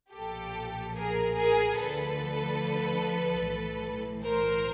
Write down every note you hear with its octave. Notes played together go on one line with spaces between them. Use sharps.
B1 A#2 F3 G4 A4
G#4 A#4
G#4 A#4
D2 D3 F3 A4 B4
B1 A2 E3
A#4 C5